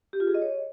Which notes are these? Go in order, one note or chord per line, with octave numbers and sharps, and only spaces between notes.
G4
F4
G#4
D#5
C#5